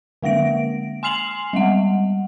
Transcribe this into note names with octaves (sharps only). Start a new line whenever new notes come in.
D3 G#3 A#3 A#6 D7
G#5 C6 F6 C7 F7 F#7
G3 G#3 F#5